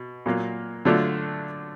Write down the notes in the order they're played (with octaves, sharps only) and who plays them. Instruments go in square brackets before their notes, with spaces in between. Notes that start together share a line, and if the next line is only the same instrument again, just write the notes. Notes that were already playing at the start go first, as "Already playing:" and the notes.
Already playing: [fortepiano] B2
A#2 F#3 A#3
D3 F#3 A3 D4 F4